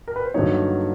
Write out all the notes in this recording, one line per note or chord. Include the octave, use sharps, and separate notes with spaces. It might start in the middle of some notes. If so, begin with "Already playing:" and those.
A#4
B4
C5
G2 D3 F#3 A#3 D#4 C#5